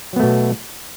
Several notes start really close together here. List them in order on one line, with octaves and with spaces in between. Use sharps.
F#3 B3 A3 B2